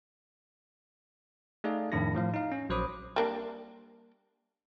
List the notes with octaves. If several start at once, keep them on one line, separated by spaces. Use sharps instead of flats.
A3 D#4 G#4 A4 D5 F5
F2 A2 D#3 D4 E4 A#6
A2 F3 F5
D#4 F5
C#4
A#1 F#3 C5 B5 D6 D#6
G3 A#3 D4